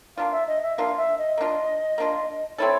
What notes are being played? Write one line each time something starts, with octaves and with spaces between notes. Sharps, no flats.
A#3 D4 F4 F5
E5
D#5
E5
A#3 D4 F4 F5
E5
D#5
A#3 D4 F4
A#3 D4 F4
A3 C4 E4 A4 C#5